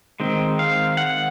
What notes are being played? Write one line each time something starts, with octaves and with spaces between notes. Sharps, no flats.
D#3 G#3 C4
F5
F#5